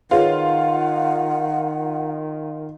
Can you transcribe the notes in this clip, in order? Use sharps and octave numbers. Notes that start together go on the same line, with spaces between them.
D#3 F4 G#4 B4 C#5 F#5